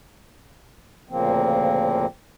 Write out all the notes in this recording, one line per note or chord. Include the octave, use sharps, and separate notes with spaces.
D2 A#2 C#3 F3 A#3 C4